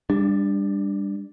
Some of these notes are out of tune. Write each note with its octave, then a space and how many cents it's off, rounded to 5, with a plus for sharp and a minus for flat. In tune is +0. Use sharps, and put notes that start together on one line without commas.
G3 +30 D4 -5